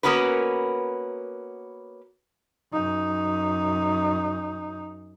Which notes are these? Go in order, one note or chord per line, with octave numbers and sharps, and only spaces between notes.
A#3 B3 C#4 F#4 A#4 B4
F#2 D#4